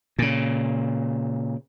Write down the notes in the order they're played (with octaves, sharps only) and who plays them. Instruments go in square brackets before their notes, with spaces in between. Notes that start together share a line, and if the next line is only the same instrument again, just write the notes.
[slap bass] A#2 C#3